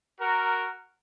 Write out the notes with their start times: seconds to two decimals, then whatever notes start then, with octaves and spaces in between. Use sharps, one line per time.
0.20 F#4 A#4